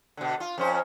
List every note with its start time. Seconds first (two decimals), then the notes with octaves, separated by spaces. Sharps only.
0.17 B2 D3
0.40 F4
0.58 F2 C#4 C5